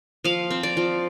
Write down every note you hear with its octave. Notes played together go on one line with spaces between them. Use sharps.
F3 F5
C4
D5
F3